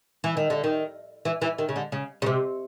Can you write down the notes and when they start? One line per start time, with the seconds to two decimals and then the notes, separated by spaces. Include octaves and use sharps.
0.24 E3
0.37 D#3
0.50 D3
0.64 D#3
1.25 E3
1.42 E3
1.58 D#3
1.69 C#3
1.76 D3
1.92 C#3
2.22 C#3
2.26 C3